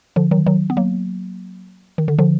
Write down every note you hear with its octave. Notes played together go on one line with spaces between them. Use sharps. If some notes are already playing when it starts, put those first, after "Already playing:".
D3 F3
D#3 F#3
D#3 F#3
B3
F#3 A#3
D#3
D3
D3 F3